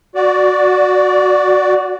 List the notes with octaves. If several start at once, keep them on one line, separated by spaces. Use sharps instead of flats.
F#4 D5